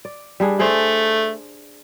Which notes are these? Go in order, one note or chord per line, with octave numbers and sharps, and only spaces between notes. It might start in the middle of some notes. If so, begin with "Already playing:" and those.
D5
G3 D4 G#4
A3 G#4 C5 D5